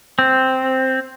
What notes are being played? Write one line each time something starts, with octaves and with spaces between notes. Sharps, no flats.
C4